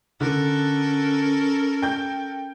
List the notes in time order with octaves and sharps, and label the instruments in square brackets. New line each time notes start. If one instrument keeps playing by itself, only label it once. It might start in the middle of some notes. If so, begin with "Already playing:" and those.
[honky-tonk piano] D3 [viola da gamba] C#4 A4 A#4
[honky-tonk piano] G5 G6